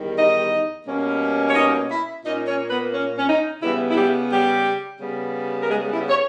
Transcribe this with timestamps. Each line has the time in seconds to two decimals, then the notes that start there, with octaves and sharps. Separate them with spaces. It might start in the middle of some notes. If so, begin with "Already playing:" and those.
Already playing: E2 D#3 G3
0.17 D#4 D#5
0.86 B2 G3 A#3 C#4
1.49 C#5
1.55 D#4 D#5
1.90 E4 E5
2.24 A#2 A#3 C#4 D#4 D#5
2.47 C#4 C#5
2.70 B3 B4
2.93 C#4
3.18 C#4
3.28 D#4
3.62 C#3 E3 G3 B3 E4
3.90 E4
3.96 G3 G4
4.31 G3 G4
5.00 C#3 G3 B3
5.61 A#4
5.69 G#3 G#4
5.91 E4 E5
6.09 C#5